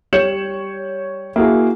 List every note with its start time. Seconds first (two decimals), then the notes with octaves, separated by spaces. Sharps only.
0.13 G3 C#5 G6 C#7 E7 F#7
1.36 A#3 E4 F#4 G#4